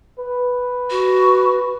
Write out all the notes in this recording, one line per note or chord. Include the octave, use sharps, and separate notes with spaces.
B4
F#4